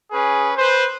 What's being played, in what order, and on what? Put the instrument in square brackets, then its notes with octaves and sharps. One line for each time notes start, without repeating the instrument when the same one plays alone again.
[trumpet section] C#4 G#4 B4
B4 C5